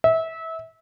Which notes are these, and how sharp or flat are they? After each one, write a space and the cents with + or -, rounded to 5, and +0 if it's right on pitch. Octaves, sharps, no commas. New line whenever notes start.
E5 -25